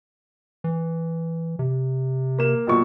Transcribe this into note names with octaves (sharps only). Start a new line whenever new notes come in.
E3
C3
A#3 E7
B1 A#2 C#6